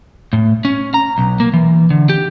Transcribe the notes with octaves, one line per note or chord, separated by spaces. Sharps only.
A2
C#4
A#5
B1
A#3
E3
D3
G4